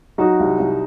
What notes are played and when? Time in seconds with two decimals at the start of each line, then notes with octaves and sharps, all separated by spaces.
0.18 F#3 D#4 F#4
0.40 C2
0.60 C2